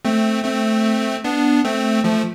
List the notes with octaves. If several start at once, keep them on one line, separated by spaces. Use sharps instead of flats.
A3 C4
A3 C4
B3 D4
A3 C4
F3 A3